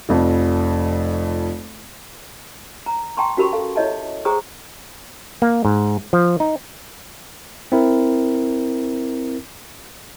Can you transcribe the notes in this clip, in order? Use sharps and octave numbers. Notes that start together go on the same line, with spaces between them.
F1 F2
A#5
G5 A5 A#5 C6 C#6
C#4 F#4 G4 A#4 B5 C#6
A4 F5 A5
E4 C#5 D#5 E5 A5
G#4 C5 G5 A#5 C#6 D#6
A#3
G#2
F3
D#4
C4 E4 A#4